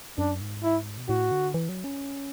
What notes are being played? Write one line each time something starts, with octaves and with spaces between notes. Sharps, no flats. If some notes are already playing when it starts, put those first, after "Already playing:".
F#2 D4
G#2
E4
B2
A2 F#4
D3
E3
F#3
C#4